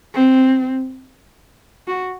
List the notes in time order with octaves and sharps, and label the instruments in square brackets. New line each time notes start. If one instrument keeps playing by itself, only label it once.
[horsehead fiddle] C4
F#4